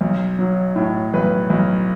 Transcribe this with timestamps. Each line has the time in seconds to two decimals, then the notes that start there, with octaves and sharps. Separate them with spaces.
0.01 B1
0.39 F#3
0.76 A2
1.14 B1 B4
1.50 B1